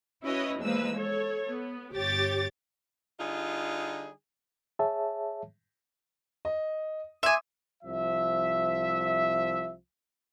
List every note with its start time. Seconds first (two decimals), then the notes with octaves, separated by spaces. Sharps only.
0.24 C#4 E4 F#4 B4 C#5 D#5
0.61 E2 F3 G#3 A#3 B4 E6
0.96 A4 C#5
1.48 B3
1.94 G1 G4 C#5 D6 A6
3.20 D3 G3 D#4 F4 G#4
4.79 G#4 C#5 E5 A5
6.45 D#5
7.23 E5 G#5 C6 D6 D#6
7.83 C2 F3 E5